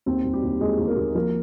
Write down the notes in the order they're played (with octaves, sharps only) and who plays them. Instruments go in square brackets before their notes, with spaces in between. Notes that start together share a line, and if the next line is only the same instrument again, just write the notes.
[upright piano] D#2 C4
D#2
G3 G4
D#2
D#2 G#3 G#4
D#2
A#3 A#4
D#2
F3 A#3 A#4